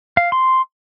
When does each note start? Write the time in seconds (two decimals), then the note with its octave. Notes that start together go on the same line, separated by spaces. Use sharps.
0.17 F5
0.32 C6